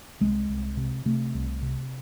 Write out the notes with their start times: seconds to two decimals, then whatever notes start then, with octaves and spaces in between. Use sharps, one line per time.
0.20 C2 G#3
0.49 C2
0.77 C3
1.06 C3 A3
1.34 C2
1.62 C3